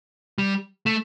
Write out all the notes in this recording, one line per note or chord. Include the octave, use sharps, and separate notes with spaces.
G3
A3